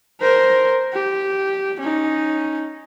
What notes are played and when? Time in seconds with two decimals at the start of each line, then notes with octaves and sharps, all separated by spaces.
0.21 A#4 C5
0.93 G4
1.80 C#4 D#4